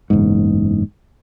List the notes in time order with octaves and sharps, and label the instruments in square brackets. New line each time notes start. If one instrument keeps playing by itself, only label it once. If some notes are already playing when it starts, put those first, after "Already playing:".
[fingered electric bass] F#1 E2 G#2